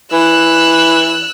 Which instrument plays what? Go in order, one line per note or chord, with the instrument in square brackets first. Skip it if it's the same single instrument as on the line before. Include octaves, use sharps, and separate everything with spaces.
[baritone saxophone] E3 [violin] E6 F#6